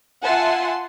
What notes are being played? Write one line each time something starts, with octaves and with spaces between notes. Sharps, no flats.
F4 E5 F#5 G#5 A5 C6